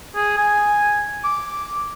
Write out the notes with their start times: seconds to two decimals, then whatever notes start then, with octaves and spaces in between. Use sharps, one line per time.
0.15 G#4
0.38 G#5
1.24 D6